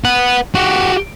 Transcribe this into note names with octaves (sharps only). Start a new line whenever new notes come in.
B4 F#5
F#4 G4